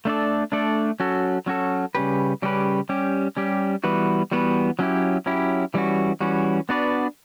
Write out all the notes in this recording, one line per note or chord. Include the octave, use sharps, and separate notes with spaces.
A3 D4 A4 D5
A3 D4 A4 D5
F#3 C#4 F#4 A4
F#3 C#4 F#4 A4
C#3 G3 C#4 G4 B4
C#3 G3 C#4 G4 B4
G3 C#4 G4
G3 C#4 G4
E3 G3 B3 F#4 B4
E3 G3 B3 F#4 B4
F#3 C#4 E4 G4
F#3 C#4 E4 G4
E3 G3 C#4 F#4
E3 G3 C#4 F#4
B3 D4 F#4 B4 D5